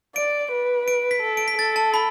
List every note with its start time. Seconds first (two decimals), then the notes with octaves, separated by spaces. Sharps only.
0.16 D5 D7
0.52 B4
0.88 D7
1.11 B6
1.22 A4
1.37 D7
1.48 B6
1.58 A4 A6
1.76 A5
1.94 B5